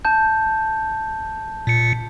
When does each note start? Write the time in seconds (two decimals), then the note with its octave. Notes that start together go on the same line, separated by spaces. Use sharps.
0.05 A5 G6
1.67 A#2 C#7